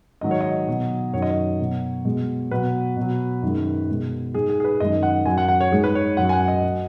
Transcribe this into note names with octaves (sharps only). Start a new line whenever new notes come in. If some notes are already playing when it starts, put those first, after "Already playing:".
G#2 D#3 F#3 D#5
C#5
D#5
B2 F#3
F#2 D#3 F#3 C#5
D#5
C#5
B2 F#3
B2 G#3
B2 F#3 B4
B2 F#3
F#2 D#3 G#3
B2 G#3
G#2 G#3 G#4
G#4
G#4
B4
F#2 D#3 G#3 D#5
F#5
F#2 F#3 G#5
F#5
F#5
C#5
G#2 G#3 G#4
B4
C#5
F#2 F#3 F#5
G#5
F#5
D#5
F#3